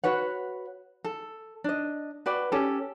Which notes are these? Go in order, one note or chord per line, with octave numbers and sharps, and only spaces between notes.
F#4 B4 C#5 F#5
A4
D4 D#5
F#4 B4 D5 G5
C#4 G4 A4